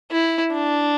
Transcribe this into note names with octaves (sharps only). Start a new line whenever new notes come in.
E4
D4